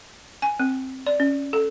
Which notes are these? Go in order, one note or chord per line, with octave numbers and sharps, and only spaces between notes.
G#5
C4
D5
C#4
A4